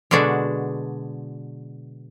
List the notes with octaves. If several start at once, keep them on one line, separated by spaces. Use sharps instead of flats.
B2 D3 G#3 D4 F#4